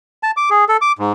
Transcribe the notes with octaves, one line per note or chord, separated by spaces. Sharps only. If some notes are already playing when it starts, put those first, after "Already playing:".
A5
D6
G#4
A4
D6
G#2